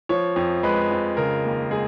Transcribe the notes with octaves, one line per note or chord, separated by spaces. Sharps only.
F3 C#5
F2
G#3 B4
F2
C#3 A#4
D#2
G#3 G#4